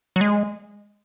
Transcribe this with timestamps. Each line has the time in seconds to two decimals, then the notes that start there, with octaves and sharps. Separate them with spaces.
0.16 F#3
0.21 G#3